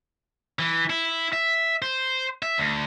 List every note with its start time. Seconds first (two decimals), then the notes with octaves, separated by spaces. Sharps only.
0.59 E3
0.90 E4
1.33 E5
1.82 C5
2.43 E5
2.58 D2